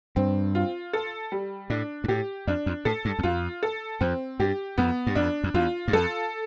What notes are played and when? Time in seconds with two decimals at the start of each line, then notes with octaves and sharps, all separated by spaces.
0.16 G2 C4
0.55 F4
0.93 A4
1.32 G3
1.70 A2 D4
2.04 G2
2.08 A2 G4
2.47 F2 D4
2.66 F2
2.85 A2 A4
3.05 G2
3.19 E2
3.23 F2 F4
3.63 A4
4.01 F2 C4
4.39 G2 G4
4.78 F2 B3
5.07 G2
5.15 F2 D4
5.44 F2
5.54 E2 F4
5.88 G2
5.93 F2 A4